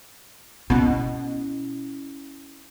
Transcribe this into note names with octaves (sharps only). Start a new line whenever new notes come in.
B2 C#4 E4